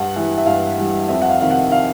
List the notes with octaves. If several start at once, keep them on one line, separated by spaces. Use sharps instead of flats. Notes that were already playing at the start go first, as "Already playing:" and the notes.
Already playing: G2 F#5
E3 G3
E5
G2 F5
E3 G3
F2 E5
F#5
F5
C3 D#3 F5
F#5
F5